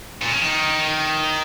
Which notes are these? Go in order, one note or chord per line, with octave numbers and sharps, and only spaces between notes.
A#2
C#3
D#3